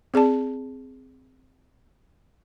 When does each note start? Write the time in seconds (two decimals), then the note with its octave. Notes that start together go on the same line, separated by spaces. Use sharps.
0.14 C4 G#4 D5 A5